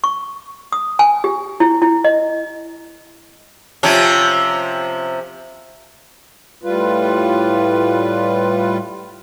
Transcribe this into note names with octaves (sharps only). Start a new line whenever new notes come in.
C#6
D#6
G#5
G4
E4
E4
D#5
C3 F3 C#4
A2 G3 F4 B4